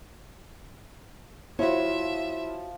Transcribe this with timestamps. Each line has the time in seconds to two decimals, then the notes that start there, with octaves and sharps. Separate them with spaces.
1.59 F3 E4 F#4 C#5 E5